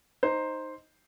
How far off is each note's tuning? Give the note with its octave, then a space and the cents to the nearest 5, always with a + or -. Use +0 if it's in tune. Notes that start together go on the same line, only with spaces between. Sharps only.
D#4 +0 C5 +5